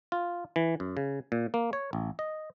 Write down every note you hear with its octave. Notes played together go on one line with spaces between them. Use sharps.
F4
E3
F#2
C#3
A#2
A#3
C#5
A1
D#5